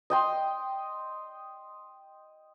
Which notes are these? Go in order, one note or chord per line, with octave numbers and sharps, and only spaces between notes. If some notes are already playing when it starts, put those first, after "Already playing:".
D#5 G5 C6